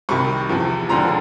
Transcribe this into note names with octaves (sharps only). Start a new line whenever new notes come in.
C2 C3 D#3 B5 C#6
E2 C3 F3
E1 D#2 D3 F3 A#5 C6